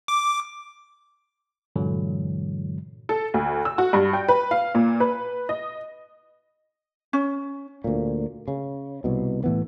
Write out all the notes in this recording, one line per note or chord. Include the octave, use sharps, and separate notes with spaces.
D6
G2 A#2 D3 E3 F#3 G#3
A4
D2
E6
F#4
G2
G5
B4
F5
A#2
B4
D#5
C#4
D2 A#2
C#3
C2 B2
A2 E3 B3